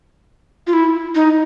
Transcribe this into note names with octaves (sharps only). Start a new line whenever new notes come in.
F4
E4
D#4